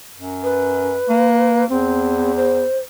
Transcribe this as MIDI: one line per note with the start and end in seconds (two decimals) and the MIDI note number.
0.16 0.98 42
0.43 1.65 71
1.09 1.64 58
1.69 2.68 40
1.69 2.32 60
2.36 2.78 72